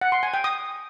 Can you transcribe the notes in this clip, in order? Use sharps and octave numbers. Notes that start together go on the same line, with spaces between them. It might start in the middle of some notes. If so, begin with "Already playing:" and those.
F#5
C6
G#5
G5
D#6